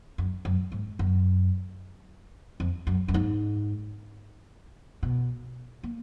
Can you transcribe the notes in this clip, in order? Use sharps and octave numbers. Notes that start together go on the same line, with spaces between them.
F#2
F#2
G#2
F#2
F2
F#2
F#2
G#2
B2
A#3